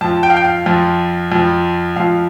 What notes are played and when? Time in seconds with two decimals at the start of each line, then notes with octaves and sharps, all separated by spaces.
0.01 F2 F3 A5
0.23 G5
0.30 F5
0.37 G5
0.44 F5
0.66 F2 F3
1.32 F2 F3
1.96 F2 F3 F5